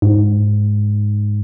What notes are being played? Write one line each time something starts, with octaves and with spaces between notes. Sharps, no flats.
G#2